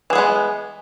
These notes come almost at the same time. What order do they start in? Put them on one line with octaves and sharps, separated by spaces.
E3 G#4 B3 G#3